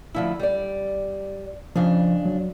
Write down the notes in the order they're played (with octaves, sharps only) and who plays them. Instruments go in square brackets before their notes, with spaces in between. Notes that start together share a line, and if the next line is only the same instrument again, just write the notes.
[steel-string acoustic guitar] D2 F3 E4
G3 D5
[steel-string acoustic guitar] F2 C#3 D4 [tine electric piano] F3
[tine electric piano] F#3